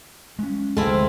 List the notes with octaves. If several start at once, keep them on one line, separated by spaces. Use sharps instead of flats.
G#3 C#4
F1 D2 G#3 C4 E4 F4 A4